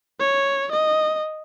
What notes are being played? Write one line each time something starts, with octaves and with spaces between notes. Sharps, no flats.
C#5
D#5